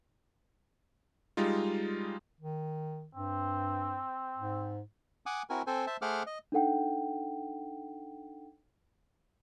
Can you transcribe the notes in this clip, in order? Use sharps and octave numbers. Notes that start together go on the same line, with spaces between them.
G3 G#3 D#4 F4
D#3
G2 C4
G#2
F#5 G#5 D6 D#6
C4 E4 F#4 A#4 G#5
C4 A4 C5 G#5
C5 E5 A5
A3 G#4 C5 F#5 D6 F6
D#5
D4 D#4 A4 F#5 G5